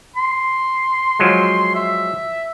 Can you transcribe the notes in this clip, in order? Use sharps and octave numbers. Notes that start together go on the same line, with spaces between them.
C6
F3 F#3 G#3
E5